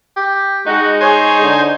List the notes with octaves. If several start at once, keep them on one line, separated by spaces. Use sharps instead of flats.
G4
G#3 D#4 F#4
G#4 C5 C#5 G#5
D3